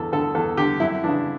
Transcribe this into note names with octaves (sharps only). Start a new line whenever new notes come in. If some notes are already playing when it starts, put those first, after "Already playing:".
Already playing: E2 D3 A4
D3 A4
E2 A4
D3 G4
F#2 E4
C#3 E3 D4